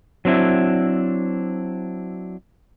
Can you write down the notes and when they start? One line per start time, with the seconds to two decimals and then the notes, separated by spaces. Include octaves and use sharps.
0.25 F#3 C4 D4 E4